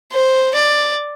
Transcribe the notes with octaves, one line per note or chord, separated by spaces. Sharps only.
C5
D5